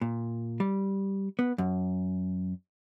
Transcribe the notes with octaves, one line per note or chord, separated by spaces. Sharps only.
A#2
G3
B3
F#2